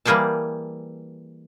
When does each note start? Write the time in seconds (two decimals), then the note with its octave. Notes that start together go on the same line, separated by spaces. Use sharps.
0.05 E3 G3 A#3 G#4 G5 A5